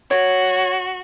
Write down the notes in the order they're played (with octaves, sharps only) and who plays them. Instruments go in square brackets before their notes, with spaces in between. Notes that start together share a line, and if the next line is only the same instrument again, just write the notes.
[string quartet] F#4 [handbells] C#5